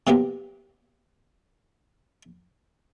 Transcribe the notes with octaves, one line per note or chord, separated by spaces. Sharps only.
C3 F#3 A#3 B3 G4